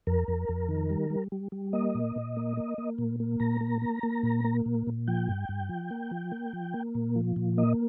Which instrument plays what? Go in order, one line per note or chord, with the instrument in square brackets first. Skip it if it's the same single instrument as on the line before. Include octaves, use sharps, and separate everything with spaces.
[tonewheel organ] F2 A#4
F2
F2
D#3
G3
G3
G3
G3
A#3 D#5
A#2
A#2
A#3
A#3
A#3
A#2
A#3
A#2 A#5
A#3
A#3
A#3
A#2
A#3
A#2
A#2
F3 G5
G2
G2
F3
A#3
F3
A#3
F3
A#3
A#2
F3
A#2
A#3 D#5